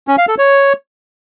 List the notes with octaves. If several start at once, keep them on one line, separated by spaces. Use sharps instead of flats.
C#4
F5
A4
C#5